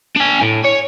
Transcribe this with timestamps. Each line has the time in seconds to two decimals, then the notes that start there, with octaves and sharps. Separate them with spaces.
0.16 D4 G#5
0.41 A2
0.64 C#5